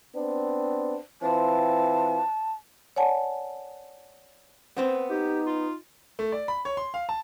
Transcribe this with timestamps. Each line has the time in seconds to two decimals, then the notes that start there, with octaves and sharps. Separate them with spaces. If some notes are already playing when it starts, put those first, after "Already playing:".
0.15 B3 C4 D4
1.22 E3 C4 F4 A5
2.96 C#5 D5 F#5 G#5 A5
4.77 B3 C4 C5
5.10 D#4 G4
5.46 F4
6.19 A3
6.32 D5
6.48 B5
6.65 C#5
6.77 C6
6.94 F5
7.09 A5